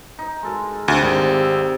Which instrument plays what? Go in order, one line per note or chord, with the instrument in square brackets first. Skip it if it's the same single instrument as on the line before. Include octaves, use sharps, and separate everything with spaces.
[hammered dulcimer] D#4
G#3 A4 A#4
[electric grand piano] D2 [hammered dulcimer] C3
[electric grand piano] G#1 [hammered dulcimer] G4 A4 A#4
[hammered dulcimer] E5